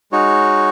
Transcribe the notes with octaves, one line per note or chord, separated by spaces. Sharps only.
G#3 D#4 F#4 C#5